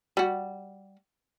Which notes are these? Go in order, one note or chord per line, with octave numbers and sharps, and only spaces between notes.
G3 F#4